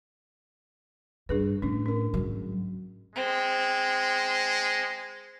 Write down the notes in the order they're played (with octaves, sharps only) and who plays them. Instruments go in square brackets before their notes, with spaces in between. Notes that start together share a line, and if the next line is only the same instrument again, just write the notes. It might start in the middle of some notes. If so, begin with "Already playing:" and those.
[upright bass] G2 [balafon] D4 G#4 B4
[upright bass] A2 [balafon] C#4 D4
[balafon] C#4 A#4
[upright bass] G#2 F#3
[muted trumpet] G#3 [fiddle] C4